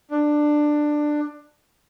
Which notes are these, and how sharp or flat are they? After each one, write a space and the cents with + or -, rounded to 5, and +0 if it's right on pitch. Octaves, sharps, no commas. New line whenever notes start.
D4 +15